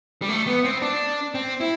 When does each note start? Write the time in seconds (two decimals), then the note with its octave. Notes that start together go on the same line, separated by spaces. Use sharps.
0.22 G3
0.29 A3
0.47 B3
0.64 C4
0.82 D4
1.35 C4
1.61 E4